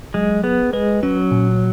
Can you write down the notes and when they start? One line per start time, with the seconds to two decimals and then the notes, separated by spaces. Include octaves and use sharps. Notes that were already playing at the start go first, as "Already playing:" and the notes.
0.14 F#3 G#3
0.44 B3 G#4
0.73 G#3 B4
1.03 F#3 C#4
1.31 A#2